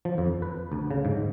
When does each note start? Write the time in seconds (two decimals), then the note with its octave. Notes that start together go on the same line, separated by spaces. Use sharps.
0.05 F3
0.18 F2
0.42 B4
0.72 D2
0.91 C#3
1.05 G#2